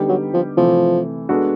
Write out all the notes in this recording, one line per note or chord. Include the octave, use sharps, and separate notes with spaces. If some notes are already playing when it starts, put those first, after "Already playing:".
Already playing: D3 G3 B3 D#4 G4
F#3
F3
C3 E3 F3 A3
G#3 B3 D4 F#4 A4